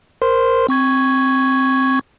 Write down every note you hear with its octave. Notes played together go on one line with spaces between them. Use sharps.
A#4 C5 C6
C4 C#6 G#6